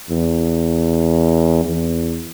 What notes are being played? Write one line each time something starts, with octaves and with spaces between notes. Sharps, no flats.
E2
E2